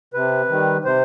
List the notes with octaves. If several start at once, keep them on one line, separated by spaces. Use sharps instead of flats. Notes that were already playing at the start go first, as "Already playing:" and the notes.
C3 B4
D#3 G3
C3 C5